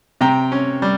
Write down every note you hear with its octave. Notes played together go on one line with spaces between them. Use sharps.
C3 G5 A#5
C#4
G3